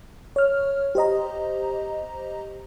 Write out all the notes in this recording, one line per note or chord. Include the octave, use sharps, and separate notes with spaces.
C#5 F6
G4 C5 D#5 A#5